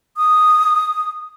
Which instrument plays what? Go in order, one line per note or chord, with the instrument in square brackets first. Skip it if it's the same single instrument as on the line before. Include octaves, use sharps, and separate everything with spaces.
[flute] D#6